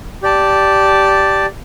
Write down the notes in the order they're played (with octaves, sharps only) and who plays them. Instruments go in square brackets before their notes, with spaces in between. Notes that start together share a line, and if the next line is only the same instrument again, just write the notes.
[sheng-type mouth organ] G4 D5 A5